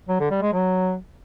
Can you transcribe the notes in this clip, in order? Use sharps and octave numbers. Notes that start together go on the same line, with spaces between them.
F#3
D3
G3
G#3
F#3